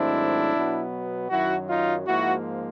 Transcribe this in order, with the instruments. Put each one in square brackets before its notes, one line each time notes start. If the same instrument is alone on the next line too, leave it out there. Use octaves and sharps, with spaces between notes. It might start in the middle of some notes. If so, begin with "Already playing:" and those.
Already playing: [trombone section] G#2 D#3 F#3 A3 C4 D4 E4
B2 F#3 B3
F#2 D#3 F#3 E4 F#4
D#4 F4
G#2 F3 A#3 E4 F#4